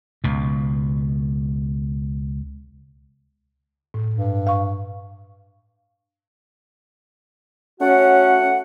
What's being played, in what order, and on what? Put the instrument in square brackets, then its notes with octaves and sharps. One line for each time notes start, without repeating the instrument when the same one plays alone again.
[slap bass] C#2 B2
[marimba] A2
[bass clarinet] G2
[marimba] F5 C#6
[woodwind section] A3 F#4 F#5 [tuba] C#4